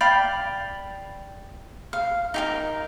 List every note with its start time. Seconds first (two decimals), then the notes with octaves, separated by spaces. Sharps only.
0.01 D5 F5 G5 B5
1.93 F5
2.34 D#4 G4 A#4